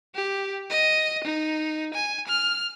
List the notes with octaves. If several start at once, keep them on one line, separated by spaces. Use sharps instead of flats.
G4
D#5
D#4
G#5
F6